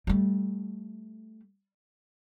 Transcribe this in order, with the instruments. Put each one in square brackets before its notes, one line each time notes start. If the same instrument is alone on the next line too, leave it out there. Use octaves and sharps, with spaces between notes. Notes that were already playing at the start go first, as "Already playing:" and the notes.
[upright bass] G3 A3